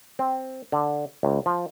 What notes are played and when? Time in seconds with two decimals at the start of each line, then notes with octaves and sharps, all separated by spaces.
0.19 C4
0.72 D3
1.23 C#2
1.46 F3